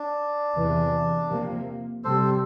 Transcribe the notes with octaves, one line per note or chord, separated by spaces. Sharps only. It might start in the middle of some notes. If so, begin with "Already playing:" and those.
Already playing: D4
E2 C3 E3
C3 F3 A#3
C3 G3 C4 A4 C5